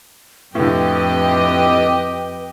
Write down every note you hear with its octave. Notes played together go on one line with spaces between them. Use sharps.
F2 A2 D3 G4 B4 D#5